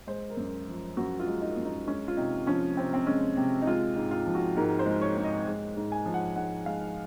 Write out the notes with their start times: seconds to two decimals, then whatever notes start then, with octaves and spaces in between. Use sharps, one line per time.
0.07 G#3 C5
0.30 A#4
0.37 F#2
0.68 F3
0.97 F#2 F#4
1.20 F4
1.27 G#3
1.42 D#4
1.57 F#2
1.65 D#4
1.87 G#3 C#4
2.08 F4
2.17 C3 D#4
2.47 F3 C#4
2.77 C3 C4
2.94 C4
3.07 G#3 C#4
3.37 C3
3.62 D#4
3.67 G#3 F4
3.96 G#2
4.11 F4
4.26 F3
4.35 F#4
4.56 G#2 A#4
4.79 C5
4.86 G#3
5.01 C#5
5.17 G#2
5.24 D#5
5.47 G#3
5.77 G#2
5.92 G#5
6.06 F3
6.14 F#5
6.36 G#2 F#5
6.66 G#3 F5